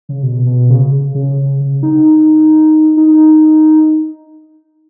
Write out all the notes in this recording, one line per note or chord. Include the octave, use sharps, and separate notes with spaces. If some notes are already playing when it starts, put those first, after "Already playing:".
C#3
B2
B2
C#3
C#3
C#3
D#4
D#4